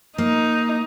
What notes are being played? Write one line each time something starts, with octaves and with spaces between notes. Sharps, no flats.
A#3 D#4